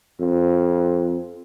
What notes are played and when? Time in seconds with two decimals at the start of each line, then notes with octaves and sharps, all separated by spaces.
0.20 F2